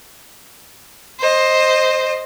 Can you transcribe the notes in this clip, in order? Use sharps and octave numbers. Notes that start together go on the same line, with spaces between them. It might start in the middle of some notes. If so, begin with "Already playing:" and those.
C5 D#5